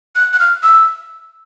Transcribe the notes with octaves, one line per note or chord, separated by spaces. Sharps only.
F#6
F#6
F6
E6